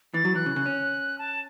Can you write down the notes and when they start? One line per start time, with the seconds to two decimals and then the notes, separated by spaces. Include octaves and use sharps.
0.14 E3 A6
0.25 F#3
0.35 E3 F#6
0.46 C#3
0.56 C#3
0.66 C#4
1.19 A5